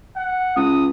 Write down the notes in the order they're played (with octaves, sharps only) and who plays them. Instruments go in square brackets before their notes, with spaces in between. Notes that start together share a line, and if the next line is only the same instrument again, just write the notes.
[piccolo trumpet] F#5
[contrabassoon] C#2 [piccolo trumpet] D#6